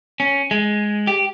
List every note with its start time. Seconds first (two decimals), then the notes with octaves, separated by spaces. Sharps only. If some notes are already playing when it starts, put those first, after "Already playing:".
0.20 C#4
0.51 G#3
1.07 G4